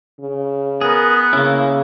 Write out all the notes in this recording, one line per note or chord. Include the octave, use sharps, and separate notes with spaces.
C#3
B3 G#4 A#4
C#3 A#3 C#4 E4